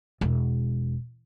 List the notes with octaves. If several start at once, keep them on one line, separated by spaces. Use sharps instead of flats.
E1